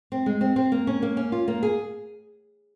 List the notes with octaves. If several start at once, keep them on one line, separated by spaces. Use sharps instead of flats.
C4
G#3
C4
C4
A#3
C#4
A#3
C#4
F4
A#3
G#4